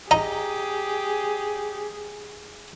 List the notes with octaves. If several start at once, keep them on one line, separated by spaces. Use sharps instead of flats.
D#4 G4 G#4 A#5